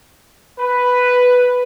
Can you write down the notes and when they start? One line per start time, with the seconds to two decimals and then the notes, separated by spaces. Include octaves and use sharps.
0.58 B4